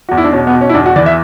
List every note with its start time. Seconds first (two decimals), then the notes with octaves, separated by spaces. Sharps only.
0.09 E2 F#4
0.18 E4
0.24 D4
0.33 B2 C#4
0.47 B3
0.54 B2
0.61 C#4
0.69 E4
0.74 E2 D4
0.86 F#4
0.96 E3 D5
1.06 E5